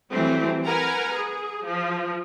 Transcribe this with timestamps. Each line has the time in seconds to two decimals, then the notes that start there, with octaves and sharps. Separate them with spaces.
0.11 E3 F#3 G3 A3 C4
0.65 A#4 B4 F#5 G#5 A#5
1.16 G#4
1.66 F3